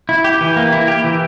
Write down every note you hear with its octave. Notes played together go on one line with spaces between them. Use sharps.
E4
G4
E3
A#3
E4
G4
E3